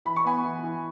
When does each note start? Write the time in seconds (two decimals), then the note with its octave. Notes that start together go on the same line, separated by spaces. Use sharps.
0.05 E3 B5
0.16 C#6
0.25 B3 G#5 B5
0.44 E3
0.63 E3